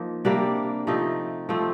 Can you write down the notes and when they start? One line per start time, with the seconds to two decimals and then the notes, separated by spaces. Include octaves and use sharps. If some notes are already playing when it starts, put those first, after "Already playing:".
Already playing: F3 A#3 D#4
0.25 C3 G3 A#3 D4
0.87 C3 F3 A3 D#4
1.49 F3 A3 C4